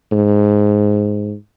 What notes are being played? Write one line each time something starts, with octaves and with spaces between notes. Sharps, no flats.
G#2